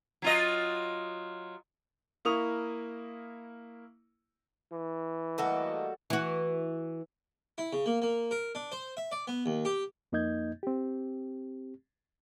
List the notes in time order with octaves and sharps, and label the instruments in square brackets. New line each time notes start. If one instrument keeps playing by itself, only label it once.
[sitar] F#3 F4 D#5
[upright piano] A#3 E4 A#4 C#6 D#6 F7
[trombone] E3
[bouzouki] G3 F#4 A4 [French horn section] A3 A#3 D#5
[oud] E3 F#4
[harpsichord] E4
C#3
A#3
A#3
A#4
D4
C5
E5
D5
B3
D#2
G4
[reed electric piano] F2 A#3 D#4 D#5 G6 G#6
C4 G4